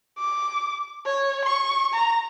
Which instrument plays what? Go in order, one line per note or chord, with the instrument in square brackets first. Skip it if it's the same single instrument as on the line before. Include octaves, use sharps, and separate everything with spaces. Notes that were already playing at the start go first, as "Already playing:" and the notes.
[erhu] D6
C#5
C#6
A#5